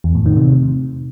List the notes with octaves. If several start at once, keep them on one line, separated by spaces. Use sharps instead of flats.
E2
A2
D#3
C3